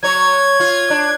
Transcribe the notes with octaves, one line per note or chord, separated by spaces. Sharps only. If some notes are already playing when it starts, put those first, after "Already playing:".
F#3 C#5 G#6
F4
D4